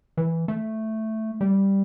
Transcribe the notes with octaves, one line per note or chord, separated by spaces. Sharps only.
E3
A3
G3